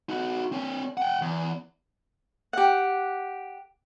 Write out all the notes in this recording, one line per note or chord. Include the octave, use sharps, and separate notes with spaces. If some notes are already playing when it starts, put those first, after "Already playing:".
D#4 F#4
C4 C#5
F#5 G5
E2
G4 F#5